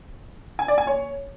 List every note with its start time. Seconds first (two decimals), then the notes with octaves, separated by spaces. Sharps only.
0.59 G#5
0.68 D5
0.78 G#5
0.87 C#5